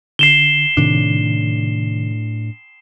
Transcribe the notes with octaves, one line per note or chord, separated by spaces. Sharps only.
D3 C7 E7 G7
A2 C3 D#3 D4